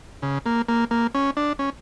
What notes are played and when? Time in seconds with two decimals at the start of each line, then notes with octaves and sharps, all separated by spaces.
0.22 C#3
0.46 A#3
0.68 A#3
0.91 A#3
1.15 C#4
1.37 D4
1.59 C#4